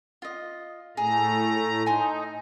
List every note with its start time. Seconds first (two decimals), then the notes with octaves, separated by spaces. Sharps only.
0.22 F4 D#5
0.97 A2 A3 G#4 A#5
1.86 D#4 G#5 A#5 C6